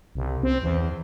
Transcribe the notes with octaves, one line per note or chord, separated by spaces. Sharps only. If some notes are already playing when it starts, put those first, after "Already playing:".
C2
C4
E2